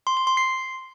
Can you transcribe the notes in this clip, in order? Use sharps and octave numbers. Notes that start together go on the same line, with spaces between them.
C6
C6
C6
C7